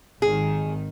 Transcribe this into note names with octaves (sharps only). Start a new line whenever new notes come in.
G#1 D#3 G#4